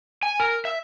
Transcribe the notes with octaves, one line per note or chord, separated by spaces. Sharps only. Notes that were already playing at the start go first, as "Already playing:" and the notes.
G#5
A#4
E5